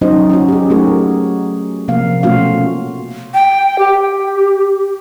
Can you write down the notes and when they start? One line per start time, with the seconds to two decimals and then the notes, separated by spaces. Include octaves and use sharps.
0.01 F#3 C#4 D#4 F#4 C5 D#5
0.30 C#4 F4 F#4
0.48 G4 G#4
0.70 A3 C#4 D#4 F#4 G#4 A#4
1.88 C3 F3 A#3 F5
2.23 B2 A3 C#4 F4 F#4 F5
3.34 G5
3.79 G4